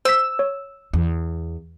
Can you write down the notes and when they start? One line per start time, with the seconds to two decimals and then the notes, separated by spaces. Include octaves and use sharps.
0.05 C5 E6 B6
0.39 C#5
0.93 E2